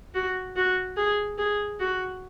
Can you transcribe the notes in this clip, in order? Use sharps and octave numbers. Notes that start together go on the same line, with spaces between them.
F#4
F#4
G#4
G#4
F#4